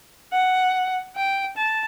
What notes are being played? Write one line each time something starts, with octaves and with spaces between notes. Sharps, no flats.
F#5
G5
A5